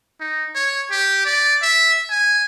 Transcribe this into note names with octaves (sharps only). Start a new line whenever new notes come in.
D#4
C#5
G4
D5
E5
G#5